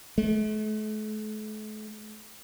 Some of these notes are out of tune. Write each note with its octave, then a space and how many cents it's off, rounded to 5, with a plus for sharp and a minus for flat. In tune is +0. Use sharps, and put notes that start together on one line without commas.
A3 -40